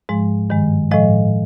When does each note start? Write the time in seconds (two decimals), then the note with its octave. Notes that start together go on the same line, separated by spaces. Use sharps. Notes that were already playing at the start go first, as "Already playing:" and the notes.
0.09 G#2 F3 G#3
0.50 G2 D#3 G#3
0.91 A2 F3 G#3 D#5